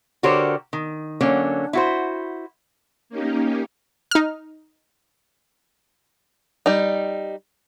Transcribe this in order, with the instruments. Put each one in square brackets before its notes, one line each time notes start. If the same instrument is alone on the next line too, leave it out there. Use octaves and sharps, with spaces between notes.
[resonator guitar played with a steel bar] D3 F#4 G4 A#4 C5 C#5
D#3
D3 F#3 A#3 C#4
E4 F#4 C5
[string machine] A#3 C#4 D#4 G4
[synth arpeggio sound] D#4 F6
[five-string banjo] G3 D#4